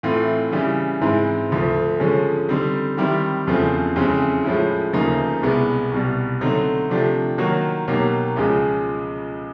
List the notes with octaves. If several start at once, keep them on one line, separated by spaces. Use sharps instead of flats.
A2 E3 A3 C4 F4
C#3 E3 G3
G#2 E3 G#3 C4 E4
D2 D3 F3 A3
D3 F3 G#3 C#4
D3 G3 C4 D#4
D#3 G3 C4 E4 G4
E2 C#3 F3 A3 C4
F2 C#3 E3 G#3 C4
A2 F3 G#3 C#4 E4
D2 C#3 F3 A#3 D#4
C2 B2 G#3 B3 E4
C2 B2 G3
D3 F#3 A3 C4 D#4
C3 F3 A3 D4 G4
D#3 F#3 A#3 D#4 F#4
B2 F#3 A#3 D#4 G4
C#2 C#3 F3 G#3